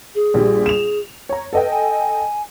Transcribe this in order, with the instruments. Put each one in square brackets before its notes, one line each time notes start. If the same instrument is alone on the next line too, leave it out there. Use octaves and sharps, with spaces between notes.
[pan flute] G#4
[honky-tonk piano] A#1 G3
E7 F7
C#5 A#5
[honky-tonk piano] A4 D#5 G5 [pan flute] B4
[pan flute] G#5